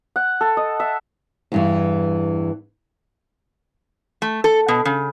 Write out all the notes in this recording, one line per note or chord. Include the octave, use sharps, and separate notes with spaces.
F#5
A4
D#5
E5
E2 G2 E3
A3
A4
B2
C#3